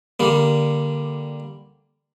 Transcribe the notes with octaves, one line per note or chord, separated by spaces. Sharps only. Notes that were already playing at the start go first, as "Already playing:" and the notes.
D3 G3 A#3